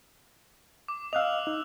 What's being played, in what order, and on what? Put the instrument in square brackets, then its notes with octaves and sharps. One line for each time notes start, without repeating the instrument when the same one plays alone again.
[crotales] D6
[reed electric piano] D#5 F5 [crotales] E6 F#6 F7
[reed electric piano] D#4